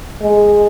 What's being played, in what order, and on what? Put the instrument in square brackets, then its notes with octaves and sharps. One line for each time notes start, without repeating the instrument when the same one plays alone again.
[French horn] G#3